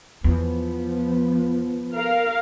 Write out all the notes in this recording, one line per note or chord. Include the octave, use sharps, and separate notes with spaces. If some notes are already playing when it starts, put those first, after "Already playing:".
E2 F3 B3
A#4 F5